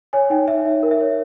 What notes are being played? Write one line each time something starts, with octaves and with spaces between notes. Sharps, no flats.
C#5 G#5
D#4 G5
C#5 E5
D#4 E5
A#4
E5
C#5